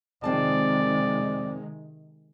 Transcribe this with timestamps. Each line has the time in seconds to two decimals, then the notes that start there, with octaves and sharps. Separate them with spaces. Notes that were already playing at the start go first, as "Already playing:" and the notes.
0.24 F2 C3 D#3 G#3 C4 D5 A5